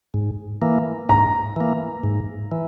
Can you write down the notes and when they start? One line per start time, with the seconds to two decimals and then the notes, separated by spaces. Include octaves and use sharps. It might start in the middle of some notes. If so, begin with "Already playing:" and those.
0.14 G#2
0.62 E3 A#3
1.09 G#2 A#5
1.56 E3 A#3
2.03 G#2
2.52 E3